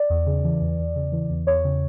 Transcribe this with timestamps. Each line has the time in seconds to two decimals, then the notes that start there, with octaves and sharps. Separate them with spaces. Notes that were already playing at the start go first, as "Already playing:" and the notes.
Already playing: D5
0.10 E2
0.26 C#3
0.44 E3
0.61 E2
0.79 E2
0.96 C#3
1.12 E3
1.30 E2
1.47 E2 C#5
1.65 C#3